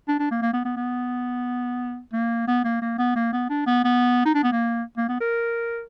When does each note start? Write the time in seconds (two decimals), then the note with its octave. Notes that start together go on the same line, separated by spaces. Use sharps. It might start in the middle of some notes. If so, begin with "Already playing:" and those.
0.09 D4
0.19 D4
0.31 A#3
0.42 A#3
0.53 B3
0.65 B3
0.77 B3
2.13 A#3
2.48 B3
2.64 A#3
2.82 A#3
2.99 B3
3.16 A#3
3.33 B3
3.50 D4
3.67 B3
3.84 B3
4.25 D#4
4.35 D4
4.43 B3
4.52 A#3
4.97 A#3
5.09 B3
5.21 A#4